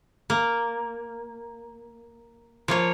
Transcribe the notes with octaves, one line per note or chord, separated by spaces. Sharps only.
A#3
F3 A#3 C#5